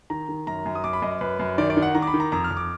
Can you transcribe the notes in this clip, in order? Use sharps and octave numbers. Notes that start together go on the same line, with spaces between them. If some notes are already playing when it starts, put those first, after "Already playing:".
D#3 A#5
D#3
F#2 A#5
F#2
D#6
F#2 D6
B5
F#2 D#5
F#2 B4
F#2
D#3 D5
D5
D#3
F#5
D#3 A#5
D6
B5
D#3
A#5
F2 A#5
F6
F2
D6